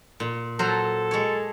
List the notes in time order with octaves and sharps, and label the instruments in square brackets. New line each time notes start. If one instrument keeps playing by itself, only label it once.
[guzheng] A#2
[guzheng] F#3 C5 A#5 [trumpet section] A4
[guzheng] G#3 C#5